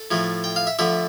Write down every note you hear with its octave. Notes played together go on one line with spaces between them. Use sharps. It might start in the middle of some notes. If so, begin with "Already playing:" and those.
Already playing: A4
A2 F3 A3
G5
F5
E5
D3 F3 A3 E5